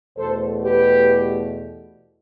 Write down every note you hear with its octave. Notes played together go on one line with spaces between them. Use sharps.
E2 B2 A3 A4 C5
G4 B4